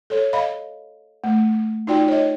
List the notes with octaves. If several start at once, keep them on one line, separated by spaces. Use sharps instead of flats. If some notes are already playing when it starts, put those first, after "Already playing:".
A4 C#5
D#5 F5 B5
A3
D#4 F4 F#4 D5 G5
C#5 D#5